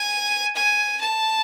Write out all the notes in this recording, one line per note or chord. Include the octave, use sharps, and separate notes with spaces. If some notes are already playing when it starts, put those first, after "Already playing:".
Already playing: G#5
G#5
A5